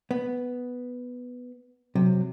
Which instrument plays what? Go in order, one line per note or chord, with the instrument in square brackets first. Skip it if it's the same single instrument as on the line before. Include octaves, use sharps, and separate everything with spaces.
[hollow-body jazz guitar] B3
[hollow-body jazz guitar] C3 [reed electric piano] F#3